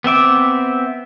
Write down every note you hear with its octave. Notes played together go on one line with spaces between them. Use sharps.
B3 C4 E5 D6